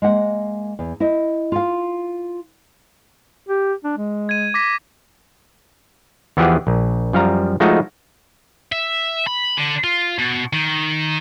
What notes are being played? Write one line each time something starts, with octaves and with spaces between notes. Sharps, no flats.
G#3 A#3 F#5
E2
E4 D#5
F4 F5
G4
D4
G#3
G#6 D#7
D6 A#6 B6
E2 E3 F3 G4 G#4 F#5
A#1
F#2 F3 G3 F5 A#5
F3 G#3 A3 D#4 F4 F#4
E5
B5
D3
F4
B2
D#3